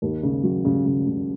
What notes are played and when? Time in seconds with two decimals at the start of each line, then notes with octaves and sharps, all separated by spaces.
0.02 D#2
0.23 C#3
0.44 F#3
0.65 C#3
0.86 C#3
1.07 C#3